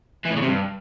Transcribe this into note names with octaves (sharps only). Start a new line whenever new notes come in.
E3
A2
C#3
C3
G2